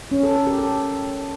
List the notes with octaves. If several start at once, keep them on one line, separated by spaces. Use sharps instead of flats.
C#4
A4
A#4
G4
A4